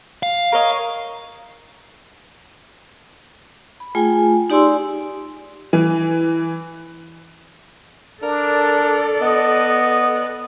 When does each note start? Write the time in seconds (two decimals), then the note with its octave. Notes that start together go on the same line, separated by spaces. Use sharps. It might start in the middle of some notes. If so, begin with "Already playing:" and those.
0.23 F5
0.52 A#4 C#5 D#5
3.80 B5
3.95 A3 F4 G#4 G5 G#5
4.50 D#4 G4 D5 G#5 C6 E6
5.73 E3
8.23 D4 A4 A#4 D5
9.22 B3 D#5